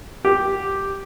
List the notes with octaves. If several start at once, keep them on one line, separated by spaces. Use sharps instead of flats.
G4